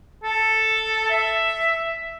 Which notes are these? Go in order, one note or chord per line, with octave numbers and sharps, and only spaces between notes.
A4
E5